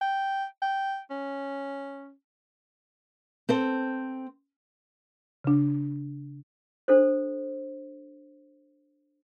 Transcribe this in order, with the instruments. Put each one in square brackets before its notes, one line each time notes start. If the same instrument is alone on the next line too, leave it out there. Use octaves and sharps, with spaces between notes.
[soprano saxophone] G5
G5
C#4
[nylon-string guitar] C4 A4 C5
[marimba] C#3 D4
[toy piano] D4 A4 C5